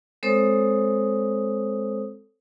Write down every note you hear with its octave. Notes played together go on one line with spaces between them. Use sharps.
G#3 C4 A4 C5 C#5 D#6